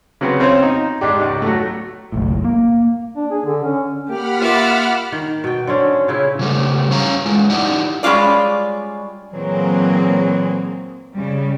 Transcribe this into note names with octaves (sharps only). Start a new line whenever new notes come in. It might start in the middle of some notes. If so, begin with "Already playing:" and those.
C#3 F#3 B3 C4
C4 C#4 F4 C5 C#5
D#4
G#2 D4 G4
C#2
F#3 A3
F#1 B1 A2
A#3
D4
G#4
D3
C#4
A#3 G4 F#5 B5 F6
A#3 F4 E5 D6
D#3
B2 G5
D3 C4 C#4
A#2 C#3 E4
C#3 G3 A3
C#4 C#5 F5 A#5
G#3 E4 F4
D#4 E4 G4 D5 D#5 F#5
G3 G#3 C#4 F4 D5
A#2 E3 F#3 A#3 C4 G#4
C#3 G3